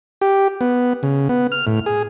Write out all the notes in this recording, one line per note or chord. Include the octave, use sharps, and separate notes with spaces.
G4
B3
C#3
B3
F6
A2
G#4